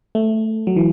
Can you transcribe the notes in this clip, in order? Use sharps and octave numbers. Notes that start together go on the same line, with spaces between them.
A3
F#3
E3